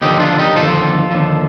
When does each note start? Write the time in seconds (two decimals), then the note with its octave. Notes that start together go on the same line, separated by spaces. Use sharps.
0.02 D#2 D3 F3 D#4 G4
0.20 D4 F4
0.38 D#4 G4
0.56 D#2 D3 F3 F4 A4
1.11 D#2 D3 F3